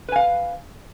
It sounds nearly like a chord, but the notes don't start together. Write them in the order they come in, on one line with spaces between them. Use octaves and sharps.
B4 G#5 F5